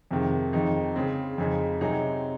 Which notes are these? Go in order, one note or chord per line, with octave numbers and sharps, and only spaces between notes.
F2 C3 D#3 G#3
F2 D#3 G#3 D#4
C#3 G#3 C4
F2 C#3 G#3 D#4 G#4
C3 F#3 C4 D#4 G#4